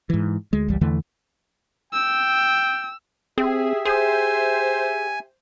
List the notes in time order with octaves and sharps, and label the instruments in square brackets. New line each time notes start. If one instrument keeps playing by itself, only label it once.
[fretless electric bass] G#2 E3
D2 G#3
G#1 C#2 E3 G3
E2 D3 E3 A3
[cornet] G5 [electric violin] E6
[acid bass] C4 [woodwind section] G4 E5 [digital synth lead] G#4
[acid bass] G#4 [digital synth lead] C5 [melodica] G#5